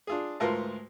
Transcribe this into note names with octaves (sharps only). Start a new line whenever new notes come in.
D4 F4 G#4
D2 G#2 F4 A#4 B4 A5